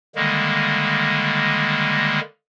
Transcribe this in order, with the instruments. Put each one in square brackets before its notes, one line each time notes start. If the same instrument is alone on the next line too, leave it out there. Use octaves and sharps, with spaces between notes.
[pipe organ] D3 D#3 G3 G#3 A#3